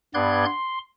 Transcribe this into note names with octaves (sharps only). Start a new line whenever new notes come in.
G2 B3 D5 C6 F#6 G#6
C6